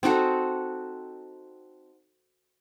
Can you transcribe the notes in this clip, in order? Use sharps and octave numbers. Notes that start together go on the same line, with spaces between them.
C4 D#4 F#4 A4